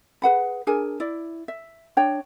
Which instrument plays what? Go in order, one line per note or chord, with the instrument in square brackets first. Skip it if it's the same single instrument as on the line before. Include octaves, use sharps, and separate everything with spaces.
[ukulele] G#4 B4 F#5 B5
D4 G#4 A#4 G#5
E4 D5
E5
D4 C#5 G5